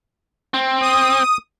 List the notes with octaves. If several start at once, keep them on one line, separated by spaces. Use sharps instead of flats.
C4
D#6